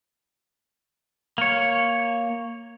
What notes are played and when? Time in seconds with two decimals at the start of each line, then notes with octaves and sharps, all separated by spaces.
1.38 A#3 C#5